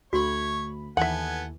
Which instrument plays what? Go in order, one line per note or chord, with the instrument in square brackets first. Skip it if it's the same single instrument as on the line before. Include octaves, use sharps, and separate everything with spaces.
[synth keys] D2 A3 B5 [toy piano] F#4 [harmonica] C#5
[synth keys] D#2 E3 [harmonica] B3 A4 G#5 [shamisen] E5 F#5